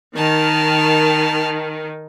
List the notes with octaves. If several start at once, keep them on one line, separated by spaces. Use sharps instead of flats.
D#3 A5 F6